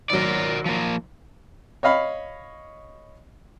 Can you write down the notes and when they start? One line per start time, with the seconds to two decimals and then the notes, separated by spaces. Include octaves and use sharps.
0.10 G#1 F#3 A#4 D5
0.66 F3 A#3
1.83 C#5 D#5 F5 B5